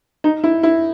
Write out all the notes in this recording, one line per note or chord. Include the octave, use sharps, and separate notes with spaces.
D#4
E4
E4